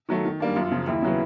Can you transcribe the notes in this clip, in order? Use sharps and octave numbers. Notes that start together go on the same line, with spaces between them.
D#3 F#3 A3
D#3
G3 A#3 D4
F#2 F4
C#3 F3
D#2 E4
C#3 F#3 B3